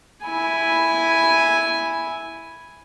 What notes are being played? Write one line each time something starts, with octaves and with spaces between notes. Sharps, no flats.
E4 G#5